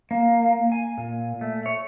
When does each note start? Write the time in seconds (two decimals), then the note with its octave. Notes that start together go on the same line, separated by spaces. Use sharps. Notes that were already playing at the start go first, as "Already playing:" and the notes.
0.11 A#3
0.72 G#5
0.98 A#2
1.41 A3
1.66 C#5